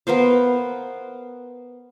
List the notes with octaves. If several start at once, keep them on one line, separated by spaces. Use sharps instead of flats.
B3 A#4 C5 F5